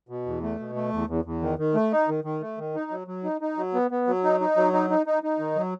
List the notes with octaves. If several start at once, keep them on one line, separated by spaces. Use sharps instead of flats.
B2
E2
A3
B2
A3
E2
E2
E2
D#3
D#3
A3
D#4
D#3
D#3
A3
D#3
D#4
F#3
F#3
D#4
D#4
F#3
B3
B3
F#3
D#4
D#4
F#3
D#4
D#4
D#4
D#4
D#3
F#3